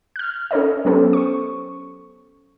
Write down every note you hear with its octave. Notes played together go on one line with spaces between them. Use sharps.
F6 F#6
C#4 A4 A#4 C#5 D#5
F#3 B3 C#4 G4 A4 C5
C#6